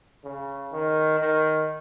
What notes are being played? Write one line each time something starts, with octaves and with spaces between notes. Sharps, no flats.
C#3
D#3
D#3